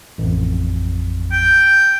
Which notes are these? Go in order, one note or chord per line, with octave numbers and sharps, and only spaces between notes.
A1 F2
G5